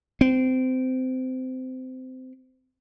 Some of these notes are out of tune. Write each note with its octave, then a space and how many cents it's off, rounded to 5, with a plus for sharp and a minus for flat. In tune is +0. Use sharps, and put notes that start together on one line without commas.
C4 -25